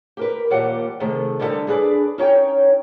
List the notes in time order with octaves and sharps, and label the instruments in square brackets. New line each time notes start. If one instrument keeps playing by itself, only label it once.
[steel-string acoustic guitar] G4 A#4 B4
D#2 A#2 F3 G3 G4 F#5
C3 D#3 G#3 A3
D3 G3 D#4 F4 A4 B4
D4 G#4 A4 B4 D5
C#4 D#4 C#5 G5